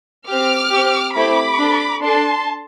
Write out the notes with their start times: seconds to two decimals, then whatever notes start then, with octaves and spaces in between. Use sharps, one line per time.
0.27 C4 G4 D6 F6
0.71 G4
0.76 C4
1.15 A3 C4 E4 G4 B5 D6
1.59 D4 A4
2.02 D4 A4 A5 C6